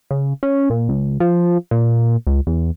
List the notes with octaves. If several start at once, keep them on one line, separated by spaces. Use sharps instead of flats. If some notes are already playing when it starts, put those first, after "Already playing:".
C#3
C#4
A#2
C#2
F3
A#2
C#2
E2